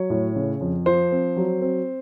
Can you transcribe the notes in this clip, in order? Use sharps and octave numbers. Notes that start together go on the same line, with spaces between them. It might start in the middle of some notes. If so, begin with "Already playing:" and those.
Already playing: F#3 C#5
A2
C#3
F2
F3 C5
C4
F#3
C4